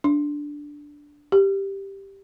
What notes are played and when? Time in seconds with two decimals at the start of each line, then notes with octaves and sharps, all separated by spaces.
0.04 D4
1.32 G4